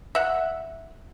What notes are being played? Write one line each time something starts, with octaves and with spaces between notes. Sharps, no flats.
E5 F#5